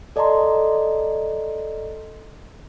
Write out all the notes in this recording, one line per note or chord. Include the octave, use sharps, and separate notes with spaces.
A4 D5 D#5 A5 A#5 C6